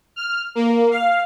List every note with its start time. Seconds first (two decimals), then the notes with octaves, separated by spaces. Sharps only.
0.16 F6
0.55 A#3
0.91 F5